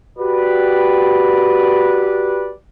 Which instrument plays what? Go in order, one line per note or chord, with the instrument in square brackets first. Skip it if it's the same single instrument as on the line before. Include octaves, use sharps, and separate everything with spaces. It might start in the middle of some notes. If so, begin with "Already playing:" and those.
[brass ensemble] F#4 G4 B4 D5